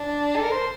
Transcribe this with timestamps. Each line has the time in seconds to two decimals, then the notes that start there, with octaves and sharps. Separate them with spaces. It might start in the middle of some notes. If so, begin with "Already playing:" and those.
Already playing: D4
0.37 A4
0.43 A#4
0.52 C5